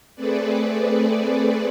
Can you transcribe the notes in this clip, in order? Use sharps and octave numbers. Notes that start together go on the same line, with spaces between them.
A3 C4 G#4 A4 B4 D5